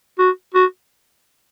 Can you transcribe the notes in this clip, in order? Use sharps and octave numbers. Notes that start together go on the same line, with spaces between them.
F#4
F#4